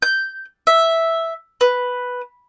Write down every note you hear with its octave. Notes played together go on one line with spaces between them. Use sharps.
G6
E5
B4